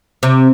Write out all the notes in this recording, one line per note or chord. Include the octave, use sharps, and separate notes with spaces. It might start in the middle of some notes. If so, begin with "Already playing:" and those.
C3